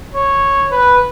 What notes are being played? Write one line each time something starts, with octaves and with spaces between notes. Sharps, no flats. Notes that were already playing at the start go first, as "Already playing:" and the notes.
C#5
B4